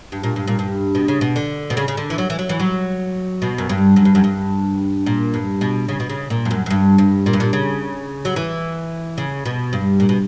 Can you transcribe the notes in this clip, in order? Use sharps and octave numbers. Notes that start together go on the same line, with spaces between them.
G2
A#2
G2
A#2
G2
B2
C#3
B2
D3
B2
C#3
C#3
D3
E3
F#3
E3
F#3
E3
F#3
B2
F#2
G2
F#2
G2
F#2
G2
A#2
G2
B2
C#3
B2
C#3
A#2
G2
F#2
F#2
G2
G2
A#2
G2
A#2
C#3
F#3
E3
C#3
B2
G2
A#2
B2